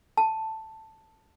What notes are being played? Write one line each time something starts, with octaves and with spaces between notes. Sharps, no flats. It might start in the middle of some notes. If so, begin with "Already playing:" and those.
A5